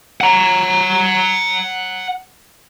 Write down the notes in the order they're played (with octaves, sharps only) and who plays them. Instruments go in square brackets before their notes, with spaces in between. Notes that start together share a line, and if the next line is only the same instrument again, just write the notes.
[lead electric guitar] F#5 A#5